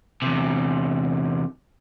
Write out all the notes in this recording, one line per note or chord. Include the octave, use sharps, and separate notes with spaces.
E2 C3